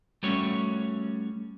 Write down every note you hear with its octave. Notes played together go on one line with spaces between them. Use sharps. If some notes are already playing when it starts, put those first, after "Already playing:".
G3 A3 C#4 F#4 C#5